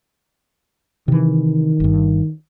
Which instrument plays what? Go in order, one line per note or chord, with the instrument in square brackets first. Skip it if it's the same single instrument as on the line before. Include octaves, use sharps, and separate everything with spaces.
[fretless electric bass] C3 E3 [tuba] D#3
[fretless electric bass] G1 G2